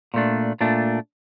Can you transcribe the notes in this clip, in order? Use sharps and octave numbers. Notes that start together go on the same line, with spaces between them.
A#2 A3 D4
A#2 A3 D4